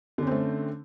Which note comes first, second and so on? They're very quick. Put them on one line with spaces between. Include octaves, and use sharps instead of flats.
D3 C#4 C4 A3